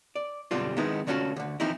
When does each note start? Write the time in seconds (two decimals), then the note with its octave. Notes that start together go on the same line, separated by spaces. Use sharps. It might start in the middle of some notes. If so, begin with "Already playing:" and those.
0.15 D5
0.51 F#2 B2 D3 G3 C4 F4
0.77 D#3 G#3 B3 C4 D#4 E4
1.07 D3 A3 C#4 F4 F#4 A4
1.36 D2 D3
1.60 E3 F3 C4 D#4 E4